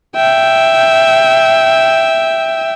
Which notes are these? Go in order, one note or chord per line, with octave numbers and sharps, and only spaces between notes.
E5 G5